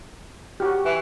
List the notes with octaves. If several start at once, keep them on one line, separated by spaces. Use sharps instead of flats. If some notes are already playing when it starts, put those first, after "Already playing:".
F#4 G4
E3